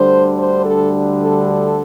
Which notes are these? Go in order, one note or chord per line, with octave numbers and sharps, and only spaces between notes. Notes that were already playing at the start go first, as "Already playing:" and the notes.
Already playing: D2 D3 G3 D4 C5
C5
A4
A4
A4